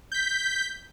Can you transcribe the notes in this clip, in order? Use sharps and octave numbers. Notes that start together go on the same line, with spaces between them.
G6 B6